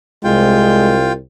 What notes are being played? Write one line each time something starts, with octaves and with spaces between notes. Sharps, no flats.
C2 G#3 F4 G5